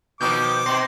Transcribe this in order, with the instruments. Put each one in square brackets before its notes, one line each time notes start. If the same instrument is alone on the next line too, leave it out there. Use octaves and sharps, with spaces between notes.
[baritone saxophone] B2 [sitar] D#3 F3 [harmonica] D6 [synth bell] G6
[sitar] B2 [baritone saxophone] C4 [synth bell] C6 A#6 C7